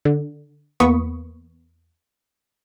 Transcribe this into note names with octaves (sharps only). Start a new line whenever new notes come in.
D3
E2 A#3 B3 B5 C#6 D#6